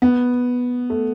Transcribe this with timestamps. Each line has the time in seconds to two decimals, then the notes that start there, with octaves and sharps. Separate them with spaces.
0.02 B3
0.90 A3